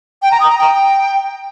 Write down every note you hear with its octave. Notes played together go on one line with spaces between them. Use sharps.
G5
A#5
D#6
A#5
G5